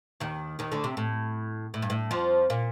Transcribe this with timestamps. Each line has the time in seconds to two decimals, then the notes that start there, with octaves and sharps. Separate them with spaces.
0.20 D#2 D#3
0.59 D#2 D#3
0.72 D2 D3
0.84 C3
0.97 A2
1.74 A2
1.82 G2
1.90 A2
2.11 F2 F3
2.50 A#2 A#3